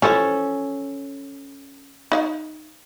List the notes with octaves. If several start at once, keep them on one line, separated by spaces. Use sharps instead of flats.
E3 F3 C#4 A4 C5
D#4 E5 F5